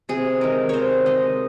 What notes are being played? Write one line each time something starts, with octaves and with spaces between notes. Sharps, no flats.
C3 G#4
D#3 G#3 A#4
C3 C5 C#5
D#3 G#3 D#5